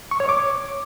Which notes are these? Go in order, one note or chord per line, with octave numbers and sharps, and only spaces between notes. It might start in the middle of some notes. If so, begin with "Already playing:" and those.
C#6
C#5
D6